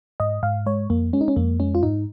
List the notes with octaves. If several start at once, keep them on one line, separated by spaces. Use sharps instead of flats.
G#2 D#5
G#2 F5
G#3 C#5
F2 A#3
G#3 C#4
D#4
C#4
F2 A#3
G#3 C#4
F4
G#2 D#4